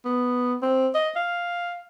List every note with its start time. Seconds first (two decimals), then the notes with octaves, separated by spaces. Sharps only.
0.05 B3
0.62 C4
0.95 D#5
1.16 F5